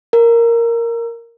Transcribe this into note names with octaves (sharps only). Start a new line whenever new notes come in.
A#4